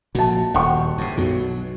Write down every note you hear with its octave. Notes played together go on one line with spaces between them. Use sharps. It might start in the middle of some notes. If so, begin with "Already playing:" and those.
A#1 A#2 F#4 A5
D#1 F#5 G5 C#6
G2 C3
B1 B2 F#3